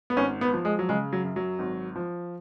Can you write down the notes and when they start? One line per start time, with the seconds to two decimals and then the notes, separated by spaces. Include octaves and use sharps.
0.10 B3
0.17 G#1 C#4
0.41 B3
0.53 F3
0.65 G#3
0.79 F#3
0.89 C#3 G#3
1.13 F#3
1.24 F#2
1.36 F#3
1.59 G#1
1.95 F3